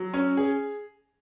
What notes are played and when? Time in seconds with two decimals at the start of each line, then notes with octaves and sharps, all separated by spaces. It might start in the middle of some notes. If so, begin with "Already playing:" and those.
Already playing: F#3
0.14 C#4
0.37 G#4